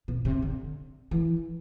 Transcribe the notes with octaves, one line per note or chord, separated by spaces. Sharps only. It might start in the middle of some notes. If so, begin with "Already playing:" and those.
B2
C3
D3
E3